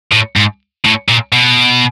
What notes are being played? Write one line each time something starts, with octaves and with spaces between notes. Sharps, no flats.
A2
G#2
A2
A#2
B2